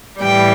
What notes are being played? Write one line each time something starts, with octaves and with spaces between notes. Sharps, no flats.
A2 E3 G3 G5